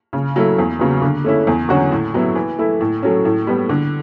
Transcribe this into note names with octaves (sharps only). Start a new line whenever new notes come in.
C#3
F#3 A3 E4
E2
C#3 F#3 B3
D3
A3 C#4 E4
E2
D3 F#3 C#4 F#4
A2
F#3 B3 E4
E3
A3 E4
A2
F#3 A3 C#4
A2
G3 B3
D3